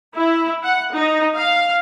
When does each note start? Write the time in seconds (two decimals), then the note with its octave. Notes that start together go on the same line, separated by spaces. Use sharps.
0.15 E4
0.63 F#5
0.93 D#4
1.36 F5